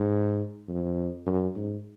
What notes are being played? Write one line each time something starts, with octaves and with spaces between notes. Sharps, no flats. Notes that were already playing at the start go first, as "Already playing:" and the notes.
Already playing: G#2
F2
F#2
G#2